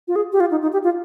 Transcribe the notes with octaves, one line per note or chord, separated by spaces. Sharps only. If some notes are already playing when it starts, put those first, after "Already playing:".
F4
G#4
G4
F4
D#4
D#4
G4
F4